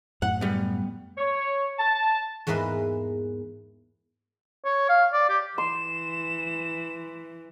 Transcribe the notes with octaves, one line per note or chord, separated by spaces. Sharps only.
F#2 A2 F#5
G3 B3
C#5
A5
E2 G#2 A#3 B4 E5 C6
C#5
F5
D5
G4
E3 C6 E7